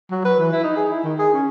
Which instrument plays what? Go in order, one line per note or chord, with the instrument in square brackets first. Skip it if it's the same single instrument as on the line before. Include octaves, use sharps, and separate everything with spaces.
[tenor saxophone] F#3
B4
E3
E4
D#4
G#4
E4
D#3
G#4
C#4